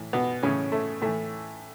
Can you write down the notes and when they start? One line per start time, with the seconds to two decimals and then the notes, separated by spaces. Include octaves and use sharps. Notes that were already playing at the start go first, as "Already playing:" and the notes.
Already playing: A2 E3
0.13 B2 B3
0.43 A2 C#3 E3 C#4
0.72 A3
1.01 A2 E3 A3